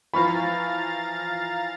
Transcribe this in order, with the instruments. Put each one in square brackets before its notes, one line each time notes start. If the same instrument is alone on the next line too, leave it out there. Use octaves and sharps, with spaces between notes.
[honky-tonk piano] E3 F3 [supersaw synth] F5 A#5 A6 [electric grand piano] B5 C#6